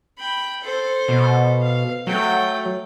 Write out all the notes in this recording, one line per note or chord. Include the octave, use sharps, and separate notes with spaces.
G5 B5
A4 C5
B2
F5
F#3 A3 G5